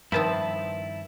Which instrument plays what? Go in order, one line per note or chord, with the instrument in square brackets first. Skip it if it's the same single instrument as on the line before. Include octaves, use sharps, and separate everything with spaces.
[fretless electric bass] G2 D#3 [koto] F3 B3 C4 [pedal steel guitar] E4 E5 A5